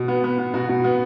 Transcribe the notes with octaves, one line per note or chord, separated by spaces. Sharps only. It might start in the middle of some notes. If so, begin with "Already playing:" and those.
Already playing: B2
B3
B3
B3
B2 F#4
B2
B3